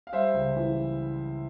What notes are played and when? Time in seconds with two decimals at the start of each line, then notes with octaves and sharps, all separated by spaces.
0.07 F5
0.13 G3 C5 E5
0.34 C#2
0.56 E3